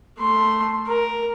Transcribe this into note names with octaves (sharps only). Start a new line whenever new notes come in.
A3 C6
A#4